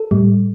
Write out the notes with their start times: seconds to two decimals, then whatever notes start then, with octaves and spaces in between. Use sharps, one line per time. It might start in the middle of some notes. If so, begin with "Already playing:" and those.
Already playing: A4
0.11 A2 G3